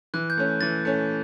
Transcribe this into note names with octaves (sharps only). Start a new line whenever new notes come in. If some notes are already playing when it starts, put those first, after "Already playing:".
E3 F#6
G6
A3 C#4
E3 A6
A3 C#4